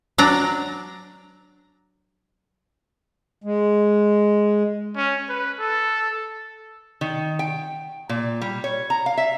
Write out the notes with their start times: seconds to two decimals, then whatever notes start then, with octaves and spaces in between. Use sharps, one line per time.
0.18 F#3 D4 A#5
3.44 G#3
4.96 C#4
5.29 B4
5.59 A4
7.01 D#3
7.39 G5
8.09 A#2
8.42 G3
8.64 C#5
8.90 A#5
9.06 F5
9.17 E5